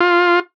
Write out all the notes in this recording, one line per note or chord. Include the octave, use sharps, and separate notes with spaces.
F4